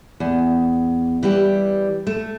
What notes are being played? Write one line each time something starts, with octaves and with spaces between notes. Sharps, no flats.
E2
E3 G3 G4
A3